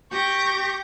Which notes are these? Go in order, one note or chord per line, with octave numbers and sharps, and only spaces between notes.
G4 C#6 G6 A#6